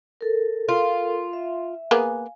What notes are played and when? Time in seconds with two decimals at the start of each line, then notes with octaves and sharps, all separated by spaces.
0.21 A4 A#4
0.69 F4
1.33 E5
1.91 A#3 B3 G#4 F5 G#5